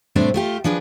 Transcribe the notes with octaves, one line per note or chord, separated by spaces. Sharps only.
A2 C3 G3 A3 C4 D4
A3 F4 G4
F3 D4 G#4 B4